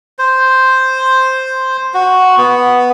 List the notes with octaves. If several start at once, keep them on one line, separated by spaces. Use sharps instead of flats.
C5
F#4
B3